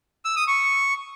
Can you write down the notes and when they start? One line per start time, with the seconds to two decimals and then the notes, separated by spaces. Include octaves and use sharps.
0.25 E6
0.36 D#6
0.48 C#6